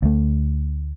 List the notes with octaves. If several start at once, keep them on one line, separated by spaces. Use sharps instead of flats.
D2 A3